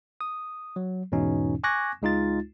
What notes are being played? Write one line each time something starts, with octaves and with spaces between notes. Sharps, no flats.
D#6
F#3
E2 G#2 B2 E3 C#4 D#4
G#5 C#6 D6 F#6 G#6 A#6
C#2 G#3 D#4 F4 A6